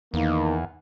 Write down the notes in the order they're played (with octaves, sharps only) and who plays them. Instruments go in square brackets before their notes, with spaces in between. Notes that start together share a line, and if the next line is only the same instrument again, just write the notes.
[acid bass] E2 [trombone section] D#3 A#3